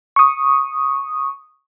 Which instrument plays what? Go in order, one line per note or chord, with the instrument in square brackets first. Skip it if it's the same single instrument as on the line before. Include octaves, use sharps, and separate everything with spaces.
[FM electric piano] C#6 D#6